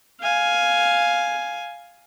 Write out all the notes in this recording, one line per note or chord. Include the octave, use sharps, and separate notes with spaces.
F5 G#5